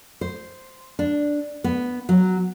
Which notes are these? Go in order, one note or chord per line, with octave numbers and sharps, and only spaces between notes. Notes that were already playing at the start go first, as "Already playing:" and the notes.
C5
D4
B3
F#3